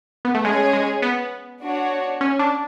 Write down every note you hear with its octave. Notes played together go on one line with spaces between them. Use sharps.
B3
A3
G#3 C#4 G#4 C#5
G#3
B3
D4 F#4 C#5
C#4
D4